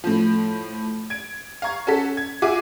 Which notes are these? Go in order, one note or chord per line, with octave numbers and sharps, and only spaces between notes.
A2 F3
G#6 D7
F5 A#5 C#6 G#6
C#4 F#4 A4 B6
G#6
F4 F#4 G#4 E5 G#5 D6